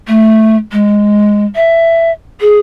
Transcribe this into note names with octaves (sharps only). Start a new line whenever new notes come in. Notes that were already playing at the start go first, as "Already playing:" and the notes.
A3
G#3
E5
G#4